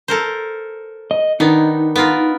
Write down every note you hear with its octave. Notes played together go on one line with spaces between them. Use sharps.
A4 A#4 C5
D#5
D#3 B3 D4 D#4
B3 F4 A#4